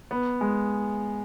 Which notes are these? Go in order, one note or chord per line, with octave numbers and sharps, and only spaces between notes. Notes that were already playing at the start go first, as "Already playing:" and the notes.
B3
G#3